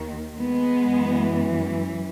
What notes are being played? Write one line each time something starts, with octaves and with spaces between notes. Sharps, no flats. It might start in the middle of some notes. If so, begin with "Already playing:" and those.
Already playing: D#2 D#3
G#3 B3
F#2 E3